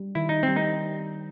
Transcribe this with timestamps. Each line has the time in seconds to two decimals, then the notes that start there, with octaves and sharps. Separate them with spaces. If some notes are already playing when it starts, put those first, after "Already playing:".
Already playing: G3
0.15 D#3 E4
0.29 D#4
0.43 G3 C4
0.56 D#4